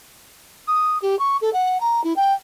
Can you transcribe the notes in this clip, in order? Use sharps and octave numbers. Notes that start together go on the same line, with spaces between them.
D#6
G4
C#6
A4
F#5
A#5
E4
G5